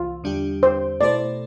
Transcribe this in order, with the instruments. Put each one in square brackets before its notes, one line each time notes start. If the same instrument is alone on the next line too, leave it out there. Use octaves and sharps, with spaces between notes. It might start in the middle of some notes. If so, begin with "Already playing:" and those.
Already playing: [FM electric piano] C2 E3 [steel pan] F4
[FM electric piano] E2 D3 G3 D4 G4
[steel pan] C5
[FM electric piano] B2 A3 E4 A4 C5 [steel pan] D5